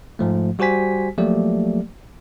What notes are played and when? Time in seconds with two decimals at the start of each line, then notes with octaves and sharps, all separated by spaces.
0.19 G#2 F3 A3
0.59 G3 F#4 G4 C5 G#5 B6
1.18 F3 F#3 A3 A#3 G4 D5